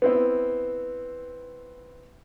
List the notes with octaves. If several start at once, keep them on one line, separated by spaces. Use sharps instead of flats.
B3 C4 E4